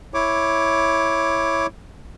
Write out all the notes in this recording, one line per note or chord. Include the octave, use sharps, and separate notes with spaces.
E4 C#5 D6